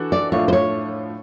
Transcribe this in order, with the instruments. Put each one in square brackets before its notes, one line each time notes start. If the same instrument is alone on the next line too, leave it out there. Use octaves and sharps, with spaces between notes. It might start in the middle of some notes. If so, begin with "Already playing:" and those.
Already playing: [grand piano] E3 D4 F#4 A4
[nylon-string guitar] D5
[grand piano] A2 F3 A3 D4 F4 [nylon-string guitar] C#5
[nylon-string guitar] C5
C#5